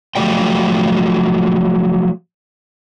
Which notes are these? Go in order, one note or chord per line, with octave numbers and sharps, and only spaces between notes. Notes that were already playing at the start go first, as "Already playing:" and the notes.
F3 F#3 A3 G4 D5 G5